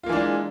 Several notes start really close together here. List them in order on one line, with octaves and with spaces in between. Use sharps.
F4 A#3 E3 D4 G#3